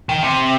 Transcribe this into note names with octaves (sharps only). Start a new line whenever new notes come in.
D#3
C3